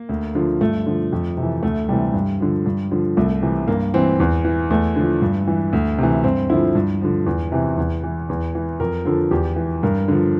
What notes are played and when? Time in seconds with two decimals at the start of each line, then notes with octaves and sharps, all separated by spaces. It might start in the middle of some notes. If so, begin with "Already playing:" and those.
Already playing: A#3
0.09 D2
0.35 D3 F3
0.61 G2 A3
0.86 D3 F3
1.12 F2
1.37 C3
1.42 E3
1.63 D2 A3
1.89 C3 E3 G3
2.14 G2
2.40 D3 F3
2.66 G2
2.91 D3 F3
3.17 C2 A3
3.42 C3 E3
3.68 G2 A#3
3.94 E3 C4
4.20 E2
4.45 E3
4.70 E2 A3
4.96 D3 F3
5.22 G2
5.48 E3
5.73 D2
5.98 C3 E3
6.24 G2 C4
6.50 D3 F3 E4
6.75 G2
7.01 D3 F3
7.26 E2
7.52 C3 E3
7.77 E2
8.04 E3
8.29 E2
8.55 E3
8.80 F2 A#4
9.05 D3 F3 A4
9.31 E2 G4
9.56 E3
9.83 G2 A#4
10.08 D3 F3